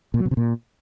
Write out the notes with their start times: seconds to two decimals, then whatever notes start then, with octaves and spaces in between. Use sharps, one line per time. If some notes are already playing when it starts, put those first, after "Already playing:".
0.14 A#2
0.20 F#3
0.25 B2
0.31 C3
0.37 A#2